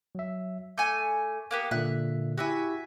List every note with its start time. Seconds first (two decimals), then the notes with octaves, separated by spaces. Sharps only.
0.15 F#3 E5
0.78 A3 G#5 D6
1.51 A#3 B3 G4
1.71 A#2 D3 E5 F#6
2.37 E4 F#4 G4 E5 G#5